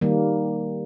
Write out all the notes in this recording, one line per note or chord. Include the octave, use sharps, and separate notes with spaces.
D#3 G3 A#3